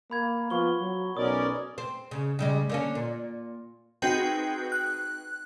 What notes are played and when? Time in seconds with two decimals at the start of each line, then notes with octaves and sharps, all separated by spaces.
0.11 A#3 B5 G#6
0.50 F3 B3 F4 C#6 G7
0.81 F#3
1.17 B1 B2 C#4 A#4 D5 D#6
1.78 C4
2.11 C#3
2.39 C#3 G3 G#3
2.69 D3 A#3 C#4
2.95 A#2
4.02 C4 D#4 F#4 G#4 B4 G5
4.72 F#6